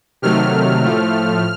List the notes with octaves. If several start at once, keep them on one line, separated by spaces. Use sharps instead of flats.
C3 D#3 F#3 A3 F6
A2 F3 A3